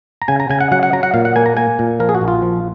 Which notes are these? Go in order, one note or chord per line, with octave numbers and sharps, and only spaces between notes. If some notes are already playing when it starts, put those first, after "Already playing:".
A#5
C#3 G#5
A#5
C#3 G#5
F#5
F#3 F#5
F#5
F#3 A#5
F#5
A#2 F5
F#5
A#3 G#5
A#5
A#3 G#5
A#2
F3 A#4
G#4
F#4
A#1
F4
F3